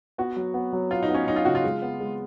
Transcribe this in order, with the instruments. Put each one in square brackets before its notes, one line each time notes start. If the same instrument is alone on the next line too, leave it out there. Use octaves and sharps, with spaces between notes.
[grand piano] B3 [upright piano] F#4
[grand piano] F#3
B3
F#3
[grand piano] B3 [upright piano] F4
[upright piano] D#4
[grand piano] B3
[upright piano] C#4
[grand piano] F#3 [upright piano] D#4
[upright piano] F4
[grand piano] C#3 [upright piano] F#4
[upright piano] F4
[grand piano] G#3
B3
G#3